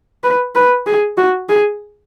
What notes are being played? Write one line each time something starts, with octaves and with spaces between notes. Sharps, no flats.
B4
B4
G#4
F#4
G#4